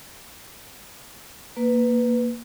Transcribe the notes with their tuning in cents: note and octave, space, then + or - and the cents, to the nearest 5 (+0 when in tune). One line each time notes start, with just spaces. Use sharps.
A#3 +0 B4 +5